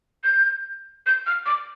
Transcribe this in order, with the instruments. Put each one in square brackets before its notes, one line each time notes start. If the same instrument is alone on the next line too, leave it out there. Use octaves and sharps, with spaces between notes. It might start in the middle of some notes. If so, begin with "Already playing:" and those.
[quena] G6
G6
F6
D6